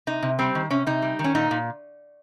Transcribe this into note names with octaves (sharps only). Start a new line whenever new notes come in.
C3 D#4
C3
G3 C4
D#3
C3 C#4
C3 D#4
G3
D#3
C#4
A#2 D#4
A#2